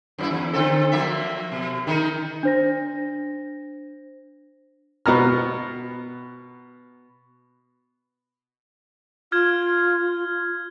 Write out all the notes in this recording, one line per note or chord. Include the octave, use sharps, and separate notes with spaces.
F#2 C#4 E4
E2
D3 C4 A4
F3 A#3 E5
B2
D#3 D#4 A#4
D4 C5 A#6
B2 B3 A#5 F6
F4 F6 G#6